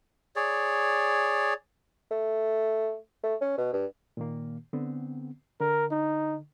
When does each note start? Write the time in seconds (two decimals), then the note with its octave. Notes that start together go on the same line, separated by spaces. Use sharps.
0.36 G#4 C#5 D5
2.11 A3
3.24 A3
3.41 C#4
3.58 B2
3.73 G2
4.17 A#2 D#3 A#3
4.73 D3 B3 C4
5.60 D3 A#4
5.92 D#4